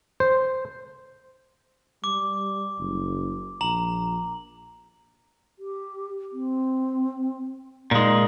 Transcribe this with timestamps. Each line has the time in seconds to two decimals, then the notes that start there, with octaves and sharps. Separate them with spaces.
0.20 C5
2.04 G3 D6
2.79 F#1
3.61 A#1 A#5 F#7
5.59 G4
6.33 C4
7.91 A#2 G#3 D#4